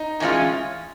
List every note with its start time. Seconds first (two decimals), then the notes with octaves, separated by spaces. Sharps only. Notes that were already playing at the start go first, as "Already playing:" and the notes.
Already playing: D#4
0.20 A2 E3 G#3 C#4 F4